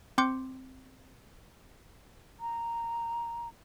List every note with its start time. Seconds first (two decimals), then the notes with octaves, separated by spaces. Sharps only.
0.18 C4 C6 D6 G6 C#7
2.40 A#5